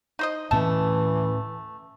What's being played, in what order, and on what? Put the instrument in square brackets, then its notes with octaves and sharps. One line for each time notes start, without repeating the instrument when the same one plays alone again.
[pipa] D#4 C5 D#5
[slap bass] D2 A2 C#4 [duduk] E3 [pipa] A3 A5